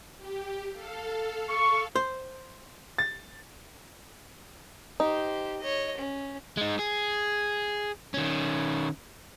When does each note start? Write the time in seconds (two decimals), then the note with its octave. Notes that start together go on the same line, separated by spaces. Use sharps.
0.18 G4
0.72 A4 F5
1.49 C#6
1.96 C5
2.98 A6
5.00 D#4 G4 C5
5.60 C#5 D#5
5.98 C#4
6.57 G#3 D#4
6.79 G#4
8.14 D#3 C#4